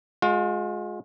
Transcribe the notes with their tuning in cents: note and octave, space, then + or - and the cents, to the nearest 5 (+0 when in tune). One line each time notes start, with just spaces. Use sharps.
G#3 +15 F4 +40